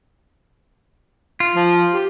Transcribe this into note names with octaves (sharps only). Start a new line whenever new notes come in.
F4
F3
G4